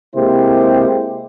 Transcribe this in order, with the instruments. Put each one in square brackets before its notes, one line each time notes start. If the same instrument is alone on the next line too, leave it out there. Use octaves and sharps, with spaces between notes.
[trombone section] C3 G#3 A#3 E4 G4 C5